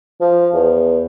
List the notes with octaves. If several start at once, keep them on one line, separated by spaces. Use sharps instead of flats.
F3
E2